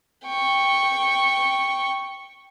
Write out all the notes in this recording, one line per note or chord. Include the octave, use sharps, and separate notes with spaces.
G5 C#6